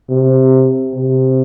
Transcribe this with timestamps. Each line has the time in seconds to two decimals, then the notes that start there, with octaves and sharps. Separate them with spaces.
0.10 C3
0.95 C3